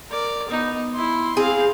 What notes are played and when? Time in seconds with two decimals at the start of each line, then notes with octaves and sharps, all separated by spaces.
0.10 A#4 D5
0.49 B3 D#4
0.95 E4 C6
1.37 C4 G#4 F5